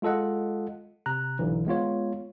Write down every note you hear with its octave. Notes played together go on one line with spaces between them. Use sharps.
G#3 F4 A4 D#5 F#5
C3 A#5 F#6
B1 D3 E3
G#3 B3 F4 C#5